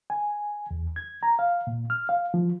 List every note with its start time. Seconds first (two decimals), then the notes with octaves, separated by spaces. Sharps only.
0.10 G#5
0.71 E2
0.96 G#6
1.23 A#5
1.39 F5
1.67 A#2
1.90 F6
2.09 F5
2.34 F3